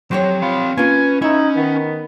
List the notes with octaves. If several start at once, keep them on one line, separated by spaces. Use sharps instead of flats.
F2 F#3 G4 C5 C#5
C4 F4 B5
A#3 C#4 F4 B4 G#5
C#4 D#4 E4 E5
D#3 B3